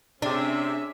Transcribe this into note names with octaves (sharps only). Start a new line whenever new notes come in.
C3 C#4 D4 G#4 E5